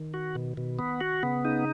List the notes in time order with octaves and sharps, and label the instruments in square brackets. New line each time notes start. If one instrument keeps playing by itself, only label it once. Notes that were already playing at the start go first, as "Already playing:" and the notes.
Already playing: [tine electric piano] D#3
[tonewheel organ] F#4
B2
B2
B3
F#4
[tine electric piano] C#3 [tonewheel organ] B3
[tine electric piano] C#3 [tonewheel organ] D#4